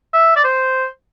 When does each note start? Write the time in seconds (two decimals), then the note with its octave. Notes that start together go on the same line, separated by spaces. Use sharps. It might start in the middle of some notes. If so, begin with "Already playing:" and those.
0.13 E5
0.36 D5
0.44 C5